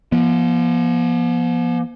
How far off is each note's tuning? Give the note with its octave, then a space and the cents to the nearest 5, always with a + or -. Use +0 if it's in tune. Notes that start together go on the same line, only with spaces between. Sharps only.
F3 -30 B3 -45